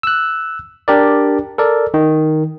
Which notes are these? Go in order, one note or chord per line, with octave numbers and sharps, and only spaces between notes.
E6 F#6
D4 G4 A#4 D5
A4 A#4 D5
D#3